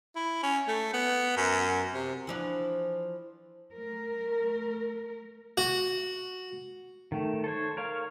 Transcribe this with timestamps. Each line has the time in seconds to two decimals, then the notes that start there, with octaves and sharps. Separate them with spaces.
0.16 E4
0.43 C#4
0.68 A3
0.93 B3
1.36 F#2
1.94 C3
2.27 E3 F3 D4
3.76 A3 A#4
5.57 F#4
7.12 D#3 A3
7.44 A4 C5 C#5
7.77 A#4 C#5 F5